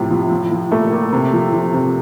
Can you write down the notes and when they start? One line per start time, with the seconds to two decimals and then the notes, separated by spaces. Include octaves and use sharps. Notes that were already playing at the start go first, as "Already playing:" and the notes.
Already playing: A2 C3 F3
0.10 F3
0.31 F3
0.51 F3
0.71 A#2 A3
0.92 A#2
1.12 C3
1.33 F3
1.53 F3
1.74 C3